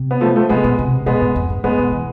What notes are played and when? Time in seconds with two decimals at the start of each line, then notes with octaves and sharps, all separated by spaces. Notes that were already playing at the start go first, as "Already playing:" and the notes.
Already playing: C3
0.11 B3
0.21 F3 A3
0.36 F3 A3
0.49 C3 G#3 B3
0.64 B2
0.79 C3
1.06 B2 G#3 B3
1.22 A2
1.36 F2
1.50 G#2
1.64 A2 G#3 B3
1.78 B2
1.92 E3